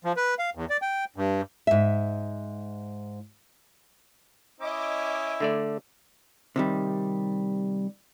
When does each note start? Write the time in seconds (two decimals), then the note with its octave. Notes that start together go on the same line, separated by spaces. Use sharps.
0.04 F3
0.17 B4
0.39 F5
0.55 E2
0.70 D5
0.82 G5
1.16 G2
1.67 G#2 E5
4.60 C#4 E4 D#5 D6
5.40 D3 A3 D5
6.56 C3 D#3 G3